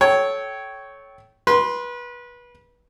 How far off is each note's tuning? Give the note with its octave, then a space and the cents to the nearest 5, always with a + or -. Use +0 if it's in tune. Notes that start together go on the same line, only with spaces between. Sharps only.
A4 -20 C#5 +0 G5 -20
B4 -25 C6 +0